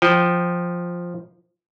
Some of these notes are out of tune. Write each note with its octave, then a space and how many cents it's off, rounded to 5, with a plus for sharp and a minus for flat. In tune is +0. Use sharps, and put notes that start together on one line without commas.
F3 +0 G5 +0